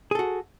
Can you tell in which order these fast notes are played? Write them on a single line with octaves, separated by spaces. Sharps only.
G#4 A4 F#4